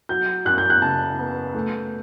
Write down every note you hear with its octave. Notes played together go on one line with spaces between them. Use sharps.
F#3 G6
F#2 F#6
G6
F#6
C#3 A5
B3
A3